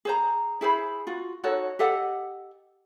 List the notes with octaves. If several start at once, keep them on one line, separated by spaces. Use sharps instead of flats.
G#4 C5 A#5
E4 G#4 C5 B5
F4 F#4
D#4 F#4 A4 C#5
G4 A4 D#5 F#5